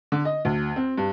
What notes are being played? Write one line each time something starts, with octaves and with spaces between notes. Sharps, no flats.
D3
D#5
D2
C4
G2